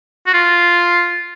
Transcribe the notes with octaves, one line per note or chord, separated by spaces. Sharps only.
F#4
F4